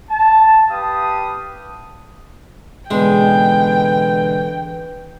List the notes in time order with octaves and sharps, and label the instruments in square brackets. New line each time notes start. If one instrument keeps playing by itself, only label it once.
[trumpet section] A5
G4 B4 F5 A5 D#6
[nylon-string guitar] B2 D3 C#4 [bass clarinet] E3 [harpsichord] G#3 [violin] G5